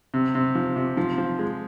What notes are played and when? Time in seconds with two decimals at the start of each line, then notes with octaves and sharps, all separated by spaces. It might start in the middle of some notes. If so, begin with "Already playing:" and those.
0.14 C3
0.35 C3
0.55 F3
0.76 C3
0.97 F3
1.18 F3
1.39 G#3